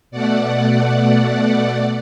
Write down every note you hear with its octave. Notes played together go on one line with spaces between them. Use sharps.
B2 A3 D5 F#5